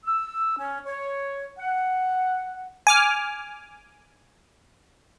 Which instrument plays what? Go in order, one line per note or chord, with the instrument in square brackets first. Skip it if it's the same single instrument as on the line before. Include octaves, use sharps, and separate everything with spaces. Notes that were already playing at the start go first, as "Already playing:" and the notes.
[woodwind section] E6
C#4
C#5
F#5
[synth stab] G#5 D6 F6